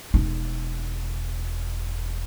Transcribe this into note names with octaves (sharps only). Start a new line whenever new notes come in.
E1 D#4